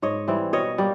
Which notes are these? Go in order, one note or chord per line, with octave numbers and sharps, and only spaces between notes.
G#2 C#5 D#5
E3 G3 C4
B2 C#5 D#5
G3 A#3